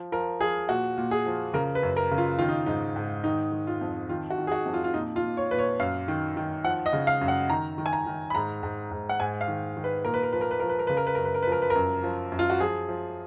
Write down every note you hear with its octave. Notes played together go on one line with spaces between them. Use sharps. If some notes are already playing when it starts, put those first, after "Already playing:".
Already playing: F3
F3 A#4
F3 G#4
A#2 F#4
A#2
G#4
F3
C#3 A#4
B4
F#2
A#4
C#3
F4
D#3 F4
D#4
G#2 D#4
G#2
D#3 D#4
D#3
F4
F2
D#3 F4
F#4
D#3
G#4
F#4
F2
F4
F4
A#2 D#4
F4
A#2
C#5
A#2 B4
C#5
F#2 F5
D#3
D#3
F3 F#5
D#5
C#3
F5
F#2
F#5
D#3 A#5
D#3
G#5
A#5
D#3
B5
G#2 A#5
G#2
G#2
F#5
G#2 G#5
F5
D#3
D#3
B4
A#2 A#4
B4
A#4
F3 B4
A#4
B4
F3 A#4
B4
A#4
C#3 B4
A#4
B4
F#2 A#4
B4
A#4
B4
F3
A#4
B4
A#4
F#2
F3
F#2
F4
F#4
F3 G#4
F3